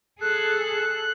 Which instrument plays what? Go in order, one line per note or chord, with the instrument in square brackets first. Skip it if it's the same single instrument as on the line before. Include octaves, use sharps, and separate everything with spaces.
[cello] G#4 A4 [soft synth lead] F#6